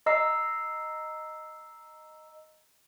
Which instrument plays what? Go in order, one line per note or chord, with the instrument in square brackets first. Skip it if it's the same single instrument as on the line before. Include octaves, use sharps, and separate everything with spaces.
[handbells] D#5 A#5 E6 C7